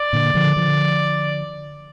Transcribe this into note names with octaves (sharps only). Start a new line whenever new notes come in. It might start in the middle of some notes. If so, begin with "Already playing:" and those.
Already playing: D5
A#2 D3
D3 F3
D3 F3